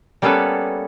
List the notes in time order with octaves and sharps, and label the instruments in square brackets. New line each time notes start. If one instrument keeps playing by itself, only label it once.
[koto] G3 A#3 B3 C#4 A4 B4